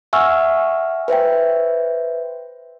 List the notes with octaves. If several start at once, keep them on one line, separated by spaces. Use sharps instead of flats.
E5 F#5 G#5 C#6 E6 F6
B4 C5 E5 G5